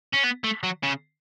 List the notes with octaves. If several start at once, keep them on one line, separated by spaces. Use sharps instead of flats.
C#4
B3
A3
F#3
C#3